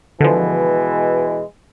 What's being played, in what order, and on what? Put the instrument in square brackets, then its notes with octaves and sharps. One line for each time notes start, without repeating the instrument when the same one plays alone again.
[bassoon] B2 [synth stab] D3 F3 [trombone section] E3 G#3